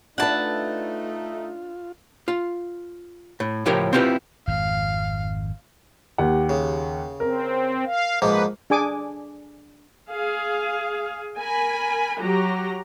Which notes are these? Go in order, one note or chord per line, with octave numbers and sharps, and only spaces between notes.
A3 D4 D#4 F4 B4 F#5 A5
F4
A2
C#2 A2 F3 G4 A#4 C#5
C4 E4 F4 G4 B4
G#1 F2 F5
D#2 G4 F#5
C#3
C4 A#4
F5
G#2 F3 A#3 B4
D4 G#4 G#5 D6
G#4 F5
A#4 G#5 B5
F#3 G4 A#5